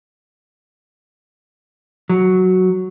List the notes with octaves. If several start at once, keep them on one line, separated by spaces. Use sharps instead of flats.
F#3